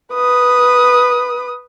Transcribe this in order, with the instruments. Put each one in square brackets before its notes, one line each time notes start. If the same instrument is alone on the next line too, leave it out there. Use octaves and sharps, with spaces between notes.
[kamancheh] B4 D#6